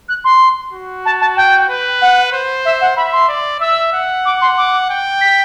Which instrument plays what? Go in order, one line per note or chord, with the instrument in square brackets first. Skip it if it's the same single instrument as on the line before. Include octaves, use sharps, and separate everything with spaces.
[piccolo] F#6
C6
[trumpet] F#4
[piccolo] A5
A5
G5
[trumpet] B4
[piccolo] F#5
[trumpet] C5
[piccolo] E5
F#5
[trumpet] E5 [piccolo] B5
[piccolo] C6
[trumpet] D5
[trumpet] E5 [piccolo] E6
[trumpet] F#5
[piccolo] D6
C6
D6
[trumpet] G5
[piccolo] B6